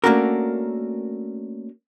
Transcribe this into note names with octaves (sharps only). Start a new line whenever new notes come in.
A3 A#3 C#4 D4 F#4 A#4